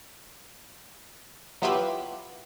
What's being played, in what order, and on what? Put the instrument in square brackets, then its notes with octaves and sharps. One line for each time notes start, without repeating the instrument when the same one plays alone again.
[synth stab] F#3 B3 E4 F4 G4 B4